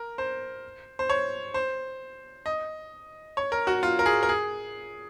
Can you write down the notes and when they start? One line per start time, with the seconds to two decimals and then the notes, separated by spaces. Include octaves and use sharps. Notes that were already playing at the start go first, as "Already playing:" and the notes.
Already playing: A#4
0.18 C5
0.99 C5
1.10 C#5
1.54 C5
2.46 D#5
3.37 C#5
3.52 A#4
3.67 F#4
3.83 F4
3.99 A#4
4.06 G#4
4.23 A#4
4.29 G#4